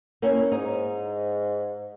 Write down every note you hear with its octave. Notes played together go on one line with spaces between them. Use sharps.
A#3 C#4 E4
G#2 D#4